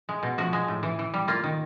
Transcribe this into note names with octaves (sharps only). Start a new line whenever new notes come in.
G#3
B2
F3 F#4
G#3
A2
E3
E3
G3
A#3 F4
D#3